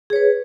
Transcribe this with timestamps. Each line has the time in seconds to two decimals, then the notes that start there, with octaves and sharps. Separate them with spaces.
0.10 G#4
0.13 C#5
0.16 B4